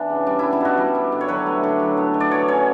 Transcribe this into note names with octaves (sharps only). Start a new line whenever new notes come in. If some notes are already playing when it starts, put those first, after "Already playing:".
Already playing: E3 B3 D4
C#3
G3 D4
B3 E4
E4
B2 F#4
G3
D4
D3
C#5
F#3 B4
A3
D3
F#3
B3
B2
D5
F#3 C#5
C#4 C#5